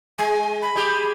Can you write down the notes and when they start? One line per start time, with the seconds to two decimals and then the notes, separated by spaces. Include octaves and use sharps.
0.19 G#3 G#5
0.62 B5
0.76 G#3 G4